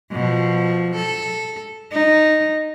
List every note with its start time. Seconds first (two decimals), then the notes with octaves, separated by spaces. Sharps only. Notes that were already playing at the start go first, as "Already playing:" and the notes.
0.12 B2 F3
0.95 A4
1.92 D#4